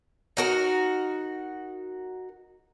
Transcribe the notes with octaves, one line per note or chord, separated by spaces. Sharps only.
D#4 F#4 A#4